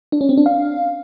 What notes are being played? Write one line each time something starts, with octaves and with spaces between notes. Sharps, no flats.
D4
C#4
C4
D4
F5